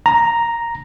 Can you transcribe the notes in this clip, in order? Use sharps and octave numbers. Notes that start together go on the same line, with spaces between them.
A#5